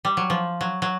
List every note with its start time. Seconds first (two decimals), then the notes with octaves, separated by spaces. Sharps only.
0.05 G3
0.17 F#3
0.30 F3
0.61 F#3
0.82 F#3